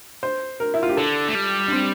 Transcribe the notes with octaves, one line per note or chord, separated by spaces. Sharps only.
C5
A#4
E4
F4
G4
D3 A4
A3
G3
D4
C4